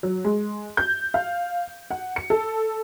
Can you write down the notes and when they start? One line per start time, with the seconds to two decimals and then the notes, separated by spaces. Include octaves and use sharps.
0.03 F#3
0.25 G#3
0.77 G6
1.14 F5
1.91 F#5
2.16 C#7
2.30 A4